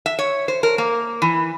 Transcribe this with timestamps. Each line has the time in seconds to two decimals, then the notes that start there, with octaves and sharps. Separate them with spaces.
0.06 E5
0.19 C#5
0.48 C5
0.63 A#4
0.78 A#3
1.22 E3